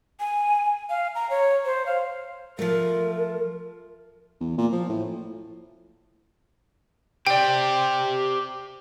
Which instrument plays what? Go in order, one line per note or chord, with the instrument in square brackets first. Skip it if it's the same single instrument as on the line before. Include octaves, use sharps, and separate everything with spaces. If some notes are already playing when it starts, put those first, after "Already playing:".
[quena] G#5
F5
A#5
C#5
C5
F5
[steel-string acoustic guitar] F3 A3 [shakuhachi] A#4
[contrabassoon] E2
A#2
F3
A2
[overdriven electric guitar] G4 C5 [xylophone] D5 G5